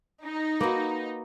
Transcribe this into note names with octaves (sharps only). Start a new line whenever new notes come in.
D#4
A#3 F#4 B4